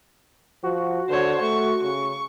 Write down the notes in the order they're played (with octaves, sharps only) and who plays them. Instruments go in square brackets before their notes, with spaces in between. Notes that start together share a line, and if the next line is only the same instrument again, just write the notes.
[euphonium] F3 [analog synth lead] F#4
[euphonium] D3 [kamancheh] C5 C#5
[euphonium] A3 [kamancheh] C#6
[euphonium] C#3 [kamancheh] C#6